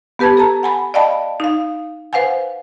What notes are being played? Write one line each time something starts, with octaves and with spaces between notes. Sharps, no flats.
B3 G4 B4 A5 G#6
A4 A5 A#5
F#5 G#5 B5
D5 D#5 F5 G5 A5 B5
D#4 F5
B4 C5 F5 F#5 G#5